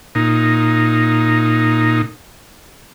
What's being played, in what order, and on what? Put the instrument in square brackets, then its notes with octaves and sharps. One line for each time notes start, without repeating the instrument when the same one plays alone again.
[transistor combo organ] A#2 D#4